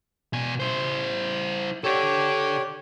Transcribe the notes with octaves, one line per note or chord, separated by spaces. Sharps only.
B2 G#5
E4 C5
G4 A4 C#5 D5